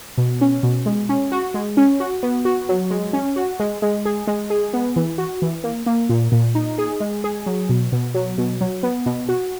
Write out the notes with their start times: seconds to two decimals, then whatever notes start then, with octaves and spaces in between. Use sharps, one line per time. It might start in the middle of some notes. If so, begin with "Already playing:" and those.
0.18 B2
0.41 C#4
0.63 B2
0.86 G#3
1.09 C#4
1.32 F#4
1.54 G#3
1.77 C#4
2.00 F#4
2.23 B3
2.45 F#4
2.69 F#3
2.90 G#3
3.13 C#4
3.36 F#4
3.60 G#3
3.82 G#3
4.05 G#4
4.27 G#3
4.50 G#4
4.73 B3
4.96 E3
5.18 F#4
5.42 E3
5.64 A#3
5.86 A#3
6.09 A#2
6.32 A#2
6.55 D#4
6.78 G#4
7.00 G#3
7.24 G#4
7.46 F#3
7.69 B2
7.92 B2
8.15 F#3
8.38 B2
8.61 F#3
8.83 B3
9.06 B2
9.29 F#4